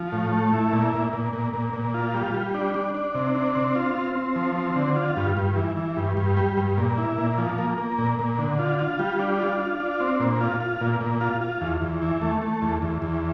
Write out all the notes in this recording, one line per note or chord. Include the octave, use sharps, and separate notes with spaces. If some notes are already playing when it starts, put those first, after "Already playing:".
Already playing: F3
A2
A3
E4
A#2
A#2
A#2
A#2
A#2
A#2
F4
G3
G3
D4
D4
D4
C3
D4
C4
F4
C4
C4
F3
C4
D3
F4
G2
G2
E3
E3
G2
G2
G3
G2
A#2
E4
A#2
F3
A#3
A#3
A#2
A#2
D3
F4
F4
G3
D4
F4
F4
D4
C4
A#2
F4
F4
A#2
A#2
F4
F4
E2
E2
E3
A3
A3
E2
E2
E2